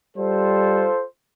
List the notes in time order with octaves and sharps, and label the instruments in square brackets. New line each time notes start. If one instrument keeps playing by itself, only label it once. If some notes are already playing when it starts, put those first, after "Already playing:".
[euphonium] G3 [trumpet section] F4 A4 C5